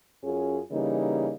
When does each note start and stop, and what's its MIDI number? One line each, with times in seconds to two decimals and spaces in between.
0.23 0.59 42
0.23 0.59 61
0.23 0.59 65
0.23 0.59 68
0.72 1.33 49
0.72 1.33 52
0.72 1.33 55
0.72 1.33 58
0.72 1.33 63